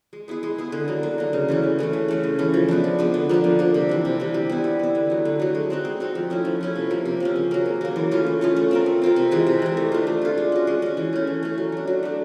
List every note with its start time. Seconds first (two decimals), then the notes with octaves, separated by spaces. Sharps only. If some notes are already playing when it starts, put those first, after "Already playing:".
0.13 G#3
0.28 B3 E4 G#4
0.43 G#3
0.58 B3 E4 G#4
0.72 D3
0.88 F#3 A#3
1.03 D3
1.18 F#3 A#3
1.33 C#3
1.48 E3 A3 C#4
1.63 C#3
1.79 E3 A3 C#4
1.93 C#3
2.08 E3 A3 C#4
2.23 C#3
2.39 E3 A3 C#4
2.54 F3
2.69 G#3 B3 D4
2.84 F3
2.99 G#3 B3 D4
3.14 D3
3.29 F3 A#3 D4
3.44 D3
3.59 F3 A#3 D4
3.74 C3
3.89 E3 G3
4.05 C3
4.20 E3 G3
4.34 G3
4.50 B3 E4
4.64 G3
4.79 B3 E4
4.95 D3
5.10 F#3 A3
5.25 D3
5.40 F#3 A3
5.55 G#3
5.70 C4 D#4 F#4
5.85 G#3
6.00 C4 D#4 F#4
6.15 F3
6.30 A3 C#4 E4
6.45 F3
6.61 A3 C#4 E4
6.76 C3
6.90 F3 A#3 C#4
7.05 C3
7.20 F3 A#3 C#4
7.36 C#3
7.51 F#3 A#3
7.66 C#3
7.81 F#3 A#3
7.96 E3
8.11 A3 C#4 F4
8.26 E3
8.41 A3 C#4 F4
8.56 A3
8.71 C4 F4 A#4
8.86 A3
9.02 C4 F4 A#4
9.16 C3
9.31 E3 G#3
9.47 C3
9.62 E3 G#3
9.77 A3
9.92 D4 F4
10.07 A3
10.22 D4 F4
10.38 G#3
10.52 C#4 F#4
10.67 G#3
10.82 C#4 F#4
10.97 E3
11.13 A3 C#4
11.27 E3
11.43 A3 C#4
11.58 F#3
11.72 A3 D4
11.87 F#3
12.03 A3 D4